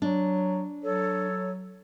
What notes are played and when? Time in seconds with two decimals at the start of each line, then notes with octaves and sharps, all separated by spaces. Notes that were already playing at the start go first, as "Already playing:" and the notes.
0.02 F#3 D4
0.83 F#3 A4 C#5